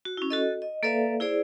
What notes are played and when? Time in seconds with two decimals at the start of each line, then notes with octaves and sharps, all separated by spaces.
0.05 F#4
0.17 C#4 E4
0.30 F#4 A4 D#5
0.62 D#5
0.83 A#3 A4 B4 D5 E5 F5
1.20 E4 G#4 C5 D5